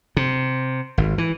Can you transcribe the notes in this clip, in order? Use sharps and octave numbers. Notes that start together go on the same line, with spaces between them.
C3
G#1
E3